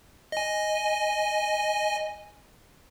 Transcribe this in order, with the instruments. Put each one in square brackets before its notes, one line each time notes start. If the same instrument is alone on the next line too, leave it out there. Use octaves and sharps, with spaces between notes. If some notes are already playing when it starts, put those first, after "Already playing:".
[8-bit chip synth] D#5 G#5